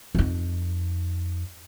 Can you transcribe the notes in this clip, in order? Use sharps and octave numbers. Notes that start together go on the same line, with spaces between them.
F2 D#4